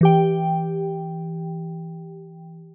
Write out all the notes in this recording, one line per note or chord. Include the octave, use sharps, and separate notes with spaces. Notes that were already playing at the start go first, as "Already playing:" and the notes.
E3 G4 G5